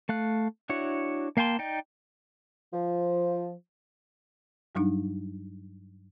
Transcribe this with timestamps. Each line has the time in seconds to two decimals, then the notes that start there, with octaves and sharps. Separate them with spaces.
0.09 A3 F5 F#6
0.69 D4 E4 F#4 C#5
1.37 A#3 F5 G5 A5 C6
1.59 D#4 D5 G5
2.73 F3
4.75 G2 F#3 G3 D4 D#4